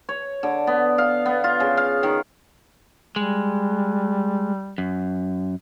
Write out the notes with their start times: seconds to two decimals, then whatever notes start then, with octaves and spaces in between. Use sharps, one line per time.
0.09 C#5
0.43 D3
0.67 B3
0.98 F5
1.26 B3
1.44 F4
1.60 C#3
1.77 F5
2.03 D#3
3.16 G3 G#3
4.78 F#2